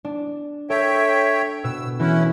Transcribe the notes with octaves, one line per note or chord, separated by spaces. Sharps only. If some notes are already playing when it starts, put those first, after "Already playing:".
D4
A4 C#5 E5 G5
B2 E6
E3 C#4 E4 F#4